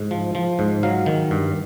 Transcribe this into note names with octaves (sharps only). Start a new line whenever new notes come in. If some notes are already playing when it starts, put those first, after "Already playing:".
Already playing: G#2
F3
F3
G#2
F#3 F5
D#3
G2